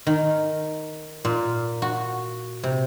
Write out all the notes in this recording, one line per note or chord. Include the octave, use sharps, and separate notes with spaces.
D#3
A#2
F#4
C3